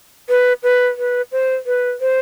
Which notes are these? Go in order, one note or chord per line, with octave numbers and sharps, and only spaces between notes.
B4
B4
B4
C5
B4
C5